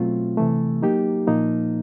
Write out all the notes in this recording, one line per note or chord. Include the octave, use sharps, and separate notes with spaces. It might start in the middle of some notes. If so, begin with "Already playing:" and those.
Already playing: B2 F#3 A3 C4 F4
C3 E3 A3
F#3 A#3 D#4 G4
A#2 F3 A#3 D#4